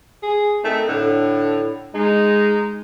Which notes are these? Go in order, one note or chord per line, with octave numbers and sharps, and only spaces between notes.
G#4
D#3 A3 C4
A2 D3
G#3 D#4